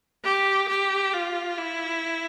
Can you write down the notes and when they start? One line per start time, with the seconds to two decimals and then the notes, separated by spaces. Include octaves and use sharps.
0.24 G4
0.68 G4
1.13 F4
1.58 E4